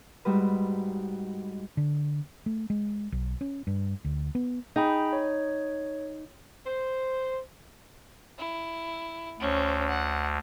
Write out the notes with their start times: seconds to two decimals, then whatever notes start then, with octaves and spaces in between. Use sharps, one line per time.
0.25 G#2 G3 F#4 B4
1.77 D3
2.46 A3
2.70 G#3
3.12 B1
3.41 C#4
3.67 G2
4.05 D2
4.35 B3
4.76 D#4 G#4 G5 B5
5.13 C#5
6.66 C5
8.39 E4
9.40 D2 C#4 C5
9.89 F#5